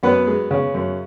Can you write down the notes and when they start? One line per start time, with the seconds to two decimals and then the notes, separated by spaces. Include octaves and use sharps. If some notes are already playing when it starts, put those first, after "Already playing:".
0.03 F#2 B3 B4
0.27 G#3
0.51 C#3
0.74 F#2